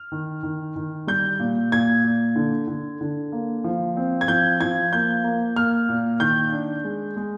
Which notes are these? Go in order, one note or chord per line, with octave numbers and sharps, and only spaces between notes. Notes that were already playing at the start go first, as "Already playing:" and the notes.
Already playing: F6
D#3
D#3
D#3
G3 G6
A#2
A#2 G#6
A#2
D3
D3
D3
A#3
F3
C4
G#6
F3 G6
F3 G#6
A#3 G6
A#3
A#3 F6
A#2
D#3 G6
D4
G#3
G#3